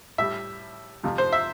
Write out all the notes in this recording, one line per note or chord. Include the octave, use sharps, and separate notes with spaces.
A2 G3 E5
F2 C3 F3
C5
E5